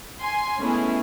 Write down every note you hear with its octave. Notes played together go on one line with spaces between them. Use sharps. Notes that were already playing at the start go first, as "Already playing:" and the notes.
G#5 C6
G#3 A3 B3 C#4 E4 G#4